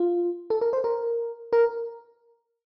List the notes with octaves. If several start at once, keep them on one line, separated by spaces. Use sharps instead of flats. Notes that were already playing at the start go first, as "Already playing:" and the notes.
Already playing: F4
A4
A#4
C5
A#4
A#4